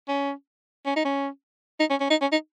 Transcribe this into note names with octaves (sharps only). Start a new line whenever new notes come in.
C#4
C#4
D#4
C#4
D#4
C#4
C#4
D#4
C#4
D#4